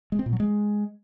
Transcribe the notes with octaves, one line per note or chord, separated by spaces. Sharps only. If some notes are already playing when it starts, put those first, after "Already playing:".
G#3
C4
A#2
F#3
G#3